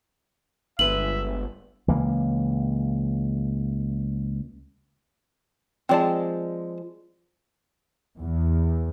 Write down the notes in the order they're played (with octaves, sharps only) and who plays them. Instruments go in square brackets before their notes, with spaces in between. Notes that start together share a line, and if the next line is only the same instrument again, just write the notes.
[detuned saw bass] G1 [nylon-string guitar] G#3 B4 [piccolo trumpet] E5 [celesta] F#7
[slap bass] C#2 E3 A#3
[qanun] F3 G#3 [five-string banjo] C4 D5 A5
[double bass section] E2